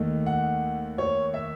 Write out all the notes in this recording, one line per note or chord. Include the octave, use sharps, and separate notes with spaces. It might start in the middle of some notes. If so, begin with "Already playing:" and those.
Already playing: D#2 D#3 A3
F#5
C#5
E5